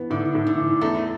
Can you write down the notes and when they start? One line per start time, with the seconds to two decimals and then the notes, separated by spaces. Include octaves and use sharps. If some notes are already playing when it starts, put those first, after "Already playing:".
Already playing: E3 B3
0.10 A2 D3
0.35 A2
0.47 D3
0.58 E3
0.81 E2 A3